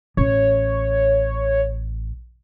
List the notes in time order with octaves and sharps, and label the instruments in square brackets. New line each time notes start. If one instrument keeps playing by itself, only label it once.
[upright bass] A1 [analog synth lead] C#5